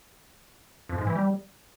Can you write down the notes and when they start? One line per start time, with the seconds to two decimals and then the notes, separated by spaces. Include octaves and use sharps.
0.89 F2
0.98 G#2
1.07 E3
1.15 G3